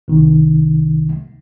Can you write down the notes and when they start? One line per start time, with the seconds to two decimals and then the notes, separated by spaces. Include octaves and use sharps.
0.08 C2 C3 D#3